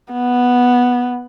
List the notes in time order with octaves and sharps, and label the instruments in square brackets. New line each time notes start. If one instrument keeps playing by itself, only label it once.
[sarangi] B3